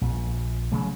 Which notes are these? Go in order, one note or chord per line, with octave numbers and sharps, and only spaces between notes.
A#1
C#3 F#3 A3